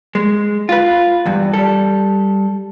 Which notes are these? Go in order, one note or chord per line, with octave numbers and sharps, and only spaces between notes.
G#3
F4 B4
E2 G2
G3 A4